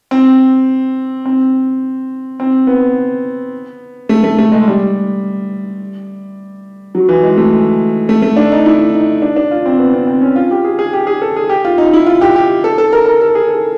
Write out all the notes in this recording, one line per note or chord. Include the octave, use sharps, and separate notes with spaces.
C4
C4
C4
B3
A3
A3
A3
G#3
G3
F#3
E3
G#3
A3
A3
A3
D4
D#4
E4
D#4
D4
D4
F4
C4
B3
C4
C4
C#4
F4
G4
G#4
G#4
G4
G#4
A4
G#4
G4
F4
D#4
E4
F4
G4
G4
A4
A4
A#4
A#4
A4
G#4
A4